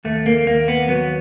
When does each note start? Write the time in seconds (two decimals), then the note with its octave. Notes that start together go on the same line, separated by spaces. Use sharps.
0.05 D#2 A3
0.26 A#3
0.46 D#2 A#3
0.68 B3
0.88 F#3 B3